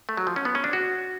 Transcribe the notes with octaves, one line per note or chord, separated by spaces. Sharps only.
A3
F#3
F3
C#4
B3
C#4
D4
F#4